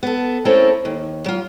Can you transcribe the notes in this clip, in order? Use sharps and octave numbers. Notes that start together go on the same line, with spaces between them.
B3 A4
A3 C4 C#4 E4 A4 A#4
D#2
F#3 F4